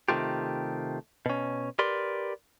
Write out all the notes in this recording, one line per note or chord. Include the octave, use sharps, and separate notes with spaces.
C3 D#3 A3 F4 G4
B2 C#4
G4 A#4 B4 D5 C6